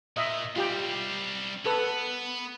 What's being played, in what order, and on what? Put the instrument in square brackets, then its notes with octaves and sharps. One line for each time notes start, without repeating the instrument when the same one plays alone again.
[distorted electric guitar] A#2 [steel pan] D#5 E5
[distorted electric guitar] G3 C4 [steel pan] F4 G4 G5
[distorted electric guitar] B3 [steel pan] A4 B4